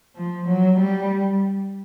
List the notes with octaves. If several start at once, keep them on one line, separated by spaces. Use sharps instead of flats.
F3
F#3
G3